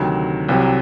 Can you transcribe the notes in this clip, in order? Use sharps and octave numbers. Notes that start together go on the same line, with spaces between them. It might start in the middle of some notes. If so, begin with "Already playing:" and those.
Already playing: D2 C3 D#3 F#3
C2 C3 F#3